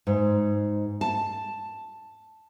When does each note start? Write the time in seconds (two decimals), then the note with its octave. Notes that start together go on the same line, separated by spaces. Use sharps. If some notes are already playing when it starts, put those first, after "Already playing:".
0.07 G#2
1.01 A5